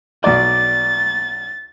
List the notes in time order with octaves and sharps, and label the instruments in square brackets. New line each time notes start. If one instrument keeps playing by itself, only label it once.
[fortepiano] B1 D5 [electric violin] A6